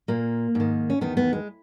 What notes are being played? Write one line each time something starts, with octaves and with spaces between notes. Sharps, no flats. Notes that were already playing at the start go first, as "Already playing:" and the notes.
A#2 A#3
G#2 D#3
C#4
E2 D#3 B3
B3
G#3